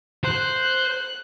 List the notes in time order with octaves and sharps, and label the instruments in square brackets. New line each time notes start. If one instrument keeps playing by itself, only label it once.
[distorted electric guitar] C5 [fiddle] F#6